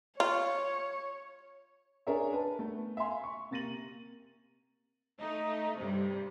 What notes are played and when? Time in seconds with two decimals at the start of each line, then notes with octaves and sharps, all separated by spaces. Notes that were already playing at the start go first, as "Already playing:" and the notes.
0.20 F4 C#5
2.07 D4 G#4 A#4 C#5 E5
2.32 B4 A5
2.59 A3 B3
2.97 E5 F5 G#5 C6
3.24 C#6
3.51 C3 A#3 A6 A#6 D#7 F#7
5.20 A3 D#4
5.77 G2 C3 G3